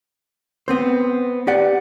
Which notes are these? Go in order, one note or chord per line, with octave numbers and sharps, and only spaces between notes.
B3 C4 C5
G4 D5 F#5